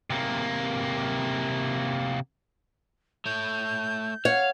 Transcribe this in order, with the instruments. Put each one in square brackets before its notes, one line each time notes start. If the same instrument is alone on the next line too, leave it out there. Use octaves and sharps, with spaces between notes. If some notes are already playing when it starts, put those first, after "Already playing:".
[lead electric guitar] C3 A#3
[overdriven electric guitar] A3 C#5 [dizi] G6
[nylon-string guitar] C#5 [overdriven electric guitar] F5 [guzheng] F#5